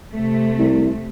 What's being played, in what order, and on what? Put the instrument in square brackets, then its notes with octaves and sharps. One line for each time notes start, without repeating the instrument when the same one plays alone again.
[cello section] C3 A3
[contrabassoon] C2